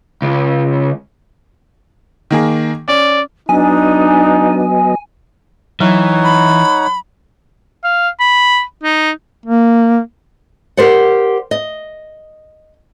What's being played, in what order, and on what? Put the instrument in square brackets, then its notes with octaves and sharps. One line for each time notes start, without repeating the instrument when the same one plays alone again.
[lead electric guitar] C#2
[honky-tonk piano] D#3 A#3 G#4
[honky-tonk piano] C#4 [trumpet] D5
[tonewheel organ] F#3 B3 D#5 [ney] D4 [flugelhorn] D#4 [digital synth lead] G#5
[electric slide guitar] E3 [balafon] F#3 [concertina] D#4 C#5 F#5
[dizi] B5
[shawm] F5
B5
D#4
[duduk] A#3
[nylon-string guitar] G4 A#4 C5 D5 F#5
D#5